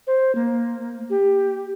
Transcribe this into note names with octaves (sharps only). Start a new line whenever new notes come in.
C5
A#3
G4